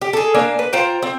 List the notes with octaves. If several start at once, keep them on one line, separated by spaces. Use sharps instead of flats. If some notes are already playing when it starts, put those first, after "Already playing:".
G4
G#4 A4
A#3 D4 F5 G#5
B4
F4 C5 G5 A#5
C4